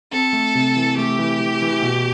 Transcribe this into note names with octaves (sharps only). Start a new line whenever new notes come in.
C4 A4
A3
C3
E3
A3 G4
E3
E3
E3
B2